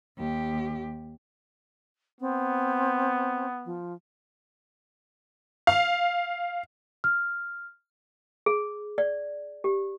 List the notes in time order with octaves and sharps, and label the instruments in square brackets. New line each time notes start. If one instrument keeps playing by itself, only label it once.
[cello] D#2 G4
[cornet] B3 [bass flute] C4
[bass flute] F3
[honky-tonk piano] F5
[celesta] F6
[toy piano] G#4
D5
G4